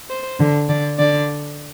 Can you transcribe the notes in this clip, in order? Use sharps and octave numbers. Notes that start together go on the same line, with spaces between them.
C5
D3
D3 D5
D3 D5